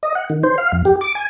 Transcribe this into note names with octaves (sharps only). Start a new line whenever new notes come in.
D#5
F#5
D#3
C5
F5
F2
G4
D6
G#5